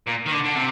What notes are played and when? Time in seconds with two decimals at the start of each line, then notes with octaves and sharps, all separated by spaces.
0.07 A#2
0.26 D#3
0.32 D3
0.44 D3
0.55 C3